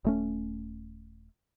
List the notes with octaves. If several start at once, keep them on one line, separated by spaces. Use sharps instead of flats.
D#1 A3 C#4